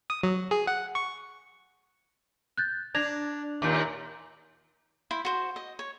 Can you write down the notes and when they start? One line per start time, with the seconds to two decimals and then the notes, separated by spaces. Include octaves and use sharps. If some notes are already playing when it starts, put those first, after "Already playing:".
0.10 D#6
0.23 F#3
0.51 G#4
0.67 F#5
0.95 C#6
2.57 F#6 G6 A6
2.95 D4 G#6 A#6 F7
3.62 D#2 A#2 D6 G6
5.11 E4 C5
5.25 F#4 C5
5.56 D#5
5.79 C#5